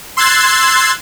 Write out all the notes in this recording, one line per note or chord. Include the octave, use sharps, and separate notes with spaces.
C6 E6 F#6 G#6 A6 C7